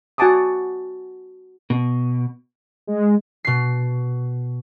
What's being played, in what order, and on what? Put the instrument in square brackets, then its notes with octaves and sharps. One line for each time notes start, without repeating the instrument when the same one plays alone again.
[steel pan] F#4 F#5 G#5 A5 D6 D#6
[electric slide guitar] B2
[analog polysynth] G#3
[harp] B2 C7